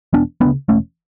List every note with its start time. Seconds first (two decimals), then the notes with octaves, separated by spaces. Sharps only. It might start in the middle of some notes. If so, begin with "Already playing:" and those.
0.13 E1 B3 D4
0.41 D2 C#3 B3 D4
0.68 E1 A3 C#4